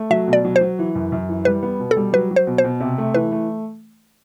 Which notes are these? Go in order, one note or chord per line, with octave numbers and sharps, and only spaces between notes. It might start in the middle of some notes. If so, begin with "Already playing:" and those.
Already playing: A3
F#3 E5
B2
D5
F#3
C5
F#3
E3
F#2
F#2
E3
G3 B4
B3
B2
A4
G3
F#3 B4
F#3
C5
B2
C5
B2
C3
A3
E3 B4
A3